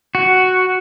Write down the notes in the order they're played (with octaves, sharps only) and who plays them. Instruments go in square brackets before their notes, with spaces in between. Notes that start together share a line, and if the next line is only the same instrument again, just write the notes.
[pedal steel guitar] F#4